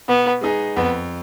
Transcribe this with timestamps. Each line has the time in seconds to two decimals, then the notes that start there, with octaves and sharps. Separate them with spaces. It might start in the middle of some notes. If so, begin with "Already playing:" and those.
0.08 B2 B3
0.41 G#3 B3 D#4 G#4
0.76 F2 B3